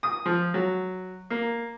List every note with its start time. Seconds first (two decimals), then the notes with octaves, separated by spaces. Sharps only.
0.03 D#6
0.26 F3
0.54 F#3
1.30 A#3